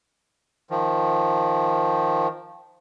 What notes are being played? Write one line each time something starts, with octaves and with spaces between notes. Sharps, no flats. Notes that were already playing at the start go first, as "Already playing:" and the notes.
D#3 F3